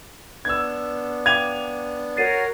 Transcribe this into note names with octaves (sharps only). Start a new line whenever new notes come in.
B3 D4 E6 G#6
F5 G5 D6 G#6 D#7 F7
F#4 A#4 C#5 A6 C7 D#7